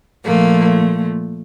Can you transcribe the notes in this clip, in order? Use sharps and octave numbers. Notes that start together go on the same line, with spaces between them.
A#2 F3 A3 A#3